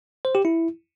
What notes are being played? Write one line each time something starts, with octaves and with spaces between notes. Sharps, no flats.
C5
G4
E4